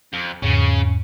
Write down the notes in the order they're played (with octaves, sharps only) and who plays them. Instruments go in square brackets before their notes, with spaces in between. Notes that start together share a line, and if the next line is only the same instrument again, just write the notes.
[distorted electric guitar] F2
[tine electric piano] E2 G#2 [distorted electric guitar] C#3 C#4